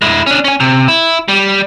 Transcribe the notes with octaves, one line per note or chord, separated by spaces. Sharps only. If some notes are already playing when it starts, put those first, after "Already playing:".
G#3 E4
C#4 D4
C#4 G#5
C3
E4
G3